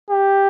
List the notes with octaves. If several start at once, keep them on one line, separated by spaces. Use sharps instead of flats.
G4